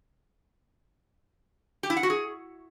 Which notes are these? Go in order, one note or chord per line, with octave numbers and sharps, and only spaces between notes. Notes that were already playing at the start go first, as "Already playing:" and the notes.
G4
E4
F#5
F#4
G#4